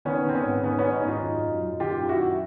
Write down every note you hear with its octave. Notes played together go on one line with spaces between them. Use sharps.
D#3 B3 C#4
D#3 C4
B3 C#4
G#2
D#3 B3 C#4
D#3 B3 C#4
C#4 D#4
G#2
D#4 F4
F#2
F#2
F#2
D#3 F4 G4
F#2
E4 F#4
F#2